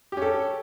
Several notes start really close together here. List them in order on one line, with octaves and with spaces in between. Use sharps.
G4 C#4 A4